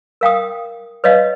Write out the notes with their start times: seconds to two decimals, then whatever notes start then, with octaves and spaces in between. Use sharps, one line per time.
0.21 A#4 F5 G5 D#6
1.04 B4 C#5 D#5 F5